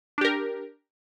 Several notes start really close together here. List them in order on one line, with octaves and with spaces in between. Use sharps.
D4 G4 A#4